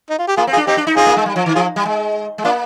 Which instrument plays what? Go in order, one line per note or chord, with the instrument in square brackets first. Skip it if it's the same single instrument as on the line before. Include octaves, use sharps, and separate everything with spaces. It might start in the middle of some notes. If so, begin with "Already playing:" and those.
[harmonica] D#4
F4
G4
[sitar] A#3 [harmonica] F4 G#4
[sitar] C4
[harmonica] F4 G#4
[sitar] D4
[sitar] C4 [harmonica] D#4 G4
[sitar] D4
D#4
[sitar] C4 [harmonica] F4 G#4
[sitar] A#3
G#3
G3
F3
D#3
[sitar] F3 [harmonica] F4 G#4
[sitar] G3
G#3
G#3
[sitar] A#3 [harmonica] D4 F4